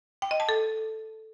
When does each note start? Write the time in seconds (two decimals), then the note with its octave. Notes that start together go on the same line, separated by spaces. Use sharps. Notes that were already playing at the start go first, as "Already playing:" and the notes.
0.22 G5
0.31 D#5
0.40 A5
0.49 A4